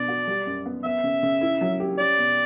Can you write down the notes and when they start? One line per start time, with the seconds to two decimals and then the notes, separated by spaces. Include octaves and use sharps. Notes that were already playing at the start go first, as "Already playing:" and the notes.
Already playing: B2 D4 D5
0.08 F#4
0.27 G3
0.46 F#2
0.66 B3
0.84 B3 E5
1.04 C#3
1.23 C#3
1.41 E4
1.61 F#3
1.80 G4
1.99 C#4 D5
2.18 B2